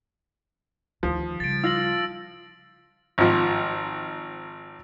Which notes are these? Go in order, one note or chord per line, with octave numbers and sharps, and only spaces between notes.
D2 D#3 F3
C#3 G3 A6 D7
F4 E6 A#6 F#7
G#1 F3